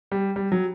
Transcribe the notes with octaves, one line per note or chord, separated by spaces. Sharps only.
G3
G3
F#3